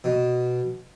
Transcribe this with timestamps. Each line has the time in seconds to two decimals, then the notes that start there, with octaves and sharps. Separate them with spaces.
0.04 B2